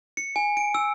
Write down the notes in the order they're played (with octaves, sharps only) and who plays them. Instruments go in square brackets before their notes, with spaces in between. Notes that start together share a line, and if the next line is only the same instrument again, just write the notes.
[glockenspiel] C#7
G#5
D7
E6